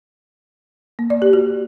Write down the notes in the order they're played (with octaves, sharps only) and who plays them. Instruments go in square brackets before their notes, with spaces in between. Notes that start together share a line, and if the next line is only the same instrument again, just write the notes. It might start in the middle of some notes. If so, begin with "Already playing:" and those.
[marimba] A#3
D5
G4
F#4